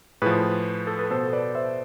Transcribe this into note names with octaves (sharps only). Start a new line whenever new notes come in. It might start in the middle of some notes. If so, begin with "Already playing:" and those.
A2 F3 G#4 B4
A4
B4
B2 A4 C5
B4 D5
C5 E5